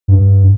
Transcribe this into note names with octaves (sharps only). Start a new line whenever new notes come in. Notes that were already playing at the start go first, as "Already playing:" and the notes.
G2